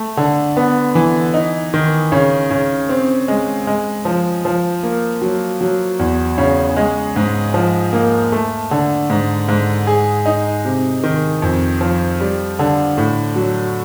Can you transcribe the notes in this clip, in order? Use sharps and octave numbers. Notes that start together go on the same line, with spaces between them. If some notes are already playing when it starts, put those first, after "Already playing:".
Already playing: A3
D3
B3
E3
D#4
D#3
C#3
C#3
C4
G#3
G#3
F3
F3
A#3
F#3
F#3
E2
C#3
G#3
G#2
F3
A#3
A3
D3
G#2
G#2
G#4
D#4
C3
D#3
F2
F3
G3
D3
A2
F#3